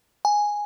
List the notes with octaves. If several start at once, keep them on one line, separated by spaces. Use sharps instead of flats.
G#5